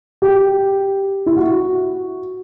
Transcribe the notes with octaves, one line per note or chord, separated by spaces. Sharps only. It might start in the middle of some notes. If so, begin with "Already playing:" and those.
G4
E4
F#4